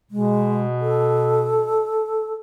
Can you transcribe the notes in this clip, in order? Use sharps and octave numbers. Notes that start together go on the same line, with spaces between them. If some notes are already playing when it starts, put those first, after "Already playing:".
B2 G#3
A4